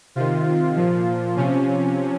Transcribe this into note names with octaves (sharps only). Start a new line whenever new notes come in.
C3 D#3 F4
F4
A#2 F3
C3 F3 C#4